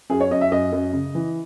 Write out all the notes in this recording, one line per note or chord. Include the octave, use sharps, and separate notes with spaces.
F#2 G#4
C#5
F#2 D#5
E5
F#2 D#5
F#2
C#3
E3